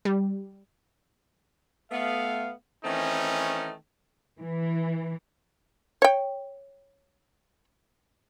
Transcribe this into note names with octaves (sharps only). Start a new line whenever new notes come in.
G3
A3 B3 F5
D#3 E3 A3 C4 C#4 D#4
E3
C#5 G5